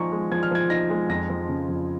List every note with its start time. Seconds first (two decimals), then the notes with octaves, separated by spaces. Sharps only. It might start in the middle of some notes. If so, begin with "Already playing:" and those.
Already playing: F3 G#3 D#4 G#5 A#5 C#6
0.12 G#3
0.32 F3 G#6
0.43 F6
0.51 F3 G#6
0.70 D#4 A#6
0.90 G#3
1.09 F2 A#6
1.29 F3
1.49 C#3
1.69 F2